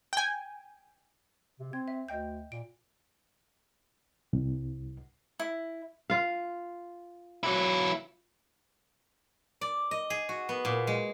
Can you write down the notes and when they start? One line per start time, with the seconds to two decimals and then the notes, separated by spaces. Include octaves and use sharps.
0.13 G5 G#5
1.60 C3
1.73 C4 G#6
1.88 E5
2.09 D2 D#5 G5 G6
2.52 A#2 D7
4.33 C2
5.39 E4
6.10 F4 F5
7.43 F#3 E4
9.61 D5
9.91 D#5
10.10 G#4
10.29 F#4
10.49 B3
10.65 A#2
10.87 G#3